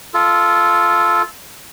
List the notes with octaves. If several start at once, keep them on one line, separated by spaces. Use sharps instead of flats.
F4 A4